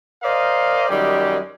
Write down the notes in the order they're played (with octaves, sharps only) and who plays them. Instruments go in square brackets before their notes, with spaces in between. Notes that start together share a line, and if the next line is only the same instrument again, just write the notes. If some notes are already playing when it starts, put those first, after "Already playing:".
[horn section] A#4 C5 D5 D#5 F5
F#2 D#3 G3 G#3 G4